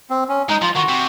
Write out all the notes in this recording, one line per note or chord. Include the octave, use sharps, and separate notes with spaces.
C4
C#4
G#3 D#4
F3 F4
D#3 F#4
C3